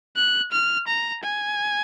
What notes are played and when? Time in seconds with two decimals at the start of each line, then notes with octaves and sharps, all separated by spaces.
0.16 F#6
0.53 F6
0.88 A#5
1.24 G#5